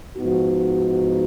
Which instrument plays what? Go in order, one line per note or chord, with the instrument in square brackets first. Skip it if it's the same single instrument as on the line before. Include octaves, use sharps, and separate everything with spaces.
[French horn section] G#2 F3 B3 D#4 F#4